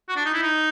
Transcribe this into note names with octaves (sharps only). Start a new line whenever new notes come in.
F#4
D4
D#4
E4
D#4